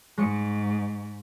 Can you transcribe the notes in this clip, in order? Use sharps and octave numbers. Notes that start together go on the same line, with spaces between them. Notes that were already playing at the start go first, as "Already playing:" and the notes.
G#2 G#3 C#6 C#7